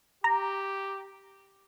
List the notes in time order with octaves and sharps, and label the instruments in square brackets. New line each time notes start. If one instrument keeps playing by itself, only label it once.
[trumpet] G4 [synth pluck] A#5